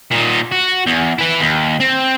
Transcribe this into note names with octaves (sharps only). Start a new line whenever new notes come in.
A#2 D#4
F#4
E2
E4 B4
D#2
C4